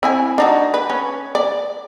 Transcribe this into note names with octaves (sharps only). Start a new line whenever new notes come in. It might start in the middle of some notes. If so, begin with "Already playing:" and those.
C4 E4 G#5
D4 D#4 F#4
B4
C#4
D5